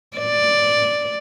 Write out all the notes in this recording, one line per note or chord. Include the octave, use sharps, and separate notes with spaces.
D5